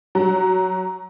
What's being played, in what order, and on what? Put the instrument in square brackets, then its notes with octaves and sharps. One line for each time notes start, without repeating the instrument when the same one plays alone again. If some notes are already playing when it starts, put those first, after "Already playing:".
[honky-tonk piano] F#3